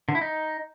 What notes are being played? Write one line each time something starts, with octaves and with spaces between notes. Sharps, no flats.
D3
E4
D#4